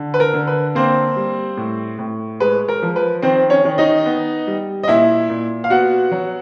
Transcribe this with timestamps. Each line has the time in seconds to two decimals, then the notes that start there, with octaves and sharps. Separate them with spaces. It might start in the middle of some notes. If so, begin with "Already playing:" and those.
Already playing: D3
0.14 B4
0.20 A#4
0.33 D3
0.47 B4
0.75 A#3 C4 C5
1.16 G3
1.57 A2
1.99 A2
2.40 G#3 B4
2.69 A#4
2.82 F3
2.96 B4
3.22 D#3 C4 C5
3.50 C#4 C#5
3.65 D#3
3.78 D#4 D#5
4.06 B3
4.47 G3
4.83 D#5
4.88 A#2 E4 E5
5.30 A#2
5.64 F5
5.70 B3 F#4 F#5
6.11 F#3